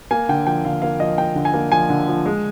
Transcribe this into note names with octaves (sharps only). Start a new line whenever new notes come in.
A#3 G#5
D3 G5
F3 G5
D3 F5
A#3 F5
F3 D#5
A#3 G5
D3
G#5
A#3
F3 G#5
D3
F3
G#3